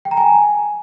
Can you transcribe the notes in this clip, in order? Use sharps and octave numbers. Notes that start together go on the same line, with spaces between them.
G5
A#5
G#5